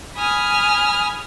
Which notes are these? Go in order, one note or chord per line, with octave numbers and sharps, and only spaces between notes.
G#5 B5 D#6 F6